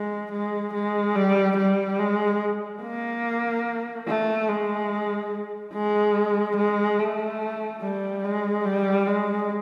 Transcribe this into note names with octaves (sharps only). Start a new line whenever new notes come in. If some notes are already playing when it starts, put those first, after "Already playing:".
Already playing: G#3
G#3
G#3
G3
G3
G#3
A#3
A3
G#3
G#3
G#3
A3
G3
G#3
G3
G#3